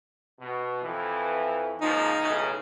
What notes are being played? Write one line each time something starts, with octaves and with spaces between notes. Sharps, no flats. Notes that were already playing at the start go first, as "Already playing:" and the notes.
B2
F2 E3
C#2 A#2 F3 D#4
B1 A2 C#3